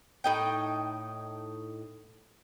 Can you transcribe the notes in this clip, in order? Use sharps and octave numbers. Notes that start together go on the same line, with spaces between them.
A2 D#4 G5